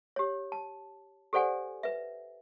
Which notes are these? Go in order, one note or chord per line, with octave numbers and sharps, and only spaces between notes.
G4 C#5
A5
G4 A4 C5 D5 F#5 G#5
B4 E5